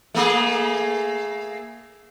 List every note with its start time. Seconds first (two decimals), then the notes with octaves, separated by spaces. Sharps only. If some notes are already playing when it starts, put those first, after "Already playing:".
0.14 A3 A#3 G#4